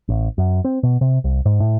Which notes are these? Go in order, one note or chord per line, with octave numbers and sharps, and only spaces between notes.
A1
F#2
C4
B2
C3
C2
G#2
A2